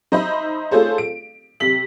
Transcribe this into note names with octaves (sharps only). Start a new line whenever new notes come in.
D#4 C5 D#5 E5 B5
A3 F4 G#4 A4 C5 C#5
D7
C3 B6 F#7